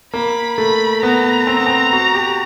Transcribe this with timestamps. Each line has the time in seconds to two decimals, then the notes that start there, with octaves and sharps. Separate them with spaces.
0.13 A#3 B5
0.58 A3 B5
1.02 B3 A#5
1.47 C4
1.57 B3
1.67 C4
1.93 F#4
2.15 G4